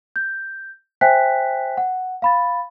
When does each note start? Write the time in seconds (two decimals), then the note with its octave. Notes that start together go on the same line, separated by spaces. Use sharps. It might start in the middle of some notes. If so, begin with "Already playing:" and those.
0.16 G6
1.01 C5 E5 G5 G#5 F#6 B6
1.77 F#5
2.22 F5 B5 A6